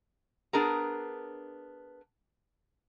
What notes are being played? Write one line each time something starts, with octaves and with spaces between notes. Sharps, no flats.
B3 D4 G#4 A#4 A#5